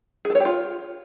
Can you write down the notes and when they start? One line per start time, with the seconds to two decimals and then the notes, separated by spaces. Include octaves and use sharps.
0.25 G#4
0.30 A4
0.35 C#5
0.40 G4
0.45 F4